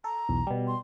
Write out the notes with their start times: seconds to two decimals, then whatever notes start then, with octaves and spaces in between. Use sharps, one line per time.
0.04 A4 A#5
0.29 B1 E2
0.47 B2 G3
0.67 C6